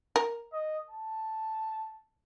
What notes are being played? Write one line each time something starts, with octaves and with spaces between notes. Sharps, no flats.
A#4
D#5
A5